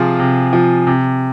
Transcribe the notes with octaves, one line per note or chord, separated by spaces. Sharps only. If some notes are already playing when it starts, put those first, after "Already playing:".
Already playing: C3 F3 F4 G#4
C3
F3
C3